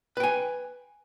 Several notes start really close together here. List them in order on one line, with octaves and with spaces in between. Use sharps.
B4 G5 G#5